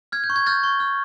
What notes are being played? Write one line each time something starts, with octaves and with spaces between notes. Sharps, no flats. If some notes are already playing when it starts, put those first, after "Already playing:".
F6 G#6
G6
C#6
G#6
F6 G6 A6
C#6
F6